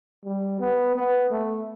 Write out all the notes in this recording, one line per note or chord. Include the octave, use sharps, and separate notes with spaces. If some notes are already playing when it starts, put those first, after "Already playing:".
G3
B3
B3
A3